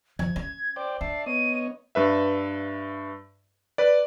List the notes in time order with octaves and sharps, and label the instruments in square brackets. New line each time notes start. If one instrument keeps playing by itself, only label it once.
[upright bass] F3 [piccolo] G#6
[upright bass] C#4
[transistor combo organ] C5 D5 G5 [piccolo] D6
[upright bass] D4 [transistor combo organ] D5 E5 A5 [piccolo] C7
[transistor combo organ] B3 C#5 D#5 [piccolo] D#7
[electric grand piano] G2 B4 E5
B4 D5